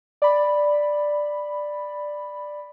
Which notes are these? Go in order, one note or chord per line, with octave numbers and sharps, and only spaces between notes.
D5 B5